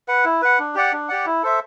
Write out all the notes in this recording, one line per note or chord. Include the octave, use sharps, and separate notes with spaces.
B4 F#5
E4
B4 F#5
D4
G4 D5 F#5
D4
G4 D5 F#5
E4
A4 C5 E5